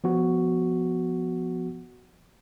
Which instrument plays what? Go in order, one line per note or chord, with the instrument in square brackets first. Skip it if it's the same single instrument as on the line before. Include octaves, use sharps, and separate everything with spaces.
[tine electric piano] F3 B3 F#4